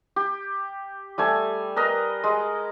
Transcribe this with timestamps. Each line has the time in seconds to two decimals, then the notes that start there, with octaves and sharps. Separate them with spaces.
0.16 G4
1.18 G3 A3 G#5
1.76 A#4 B4 D#5 A#5
2.24 G#3